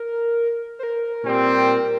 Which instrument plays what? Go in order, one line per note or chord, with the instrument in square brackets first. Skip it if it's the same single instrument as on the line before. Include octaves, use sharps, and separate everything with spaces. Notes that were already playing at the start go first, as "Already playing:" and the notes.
Already playing: [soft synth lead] A#4
C5
A#4
[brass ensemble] A#2 G3 C4